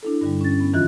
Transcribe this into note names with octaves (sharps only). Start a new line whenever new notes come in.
D4 E4 A4
G2 D3 G3
C#4 A6
B3
F#2 D#3 E3 F4 F#6